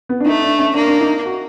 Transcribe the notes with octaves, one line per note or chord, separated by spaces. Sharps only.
B3
D4
A3 D#4
D4
C#4
A#3 D4
D4
D#4
F#4